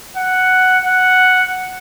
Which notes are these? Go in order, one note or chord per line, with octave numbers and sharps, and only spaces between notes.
F#5
F#5